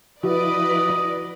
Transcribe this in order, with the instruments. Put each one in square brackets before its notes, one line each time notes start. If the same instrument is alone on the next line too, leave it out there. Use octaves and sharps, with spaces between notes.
[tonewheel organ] F3 E4 [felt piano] F#4 [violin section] B4 D5 [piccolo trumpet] D#5